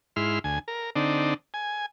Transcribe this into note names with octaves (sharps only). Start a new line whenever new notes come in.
G#2 E4 C6 F6
D2 G#5
A#4
D3 C4 D4 D#4
G#5